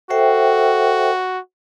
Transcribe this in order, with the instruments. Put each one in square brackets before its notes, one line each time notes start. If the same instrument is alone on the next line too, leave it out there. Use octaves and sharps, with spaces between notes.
[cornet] F#4 [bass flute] A4 [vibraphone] C5 E5 G5